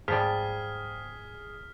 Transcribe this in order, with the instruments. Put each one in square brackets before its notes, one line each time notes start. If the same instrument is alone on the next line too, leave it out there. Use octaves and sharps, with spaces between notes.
[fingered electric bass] G#2 D#3 [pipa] F3 G3 [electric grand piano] G#4 [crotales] F6 B6